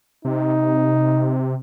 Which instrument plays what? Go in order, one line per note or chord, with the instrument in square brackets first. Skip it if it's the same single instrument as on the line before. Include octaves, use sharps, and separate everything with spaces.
[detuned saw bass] C3 [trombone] D#4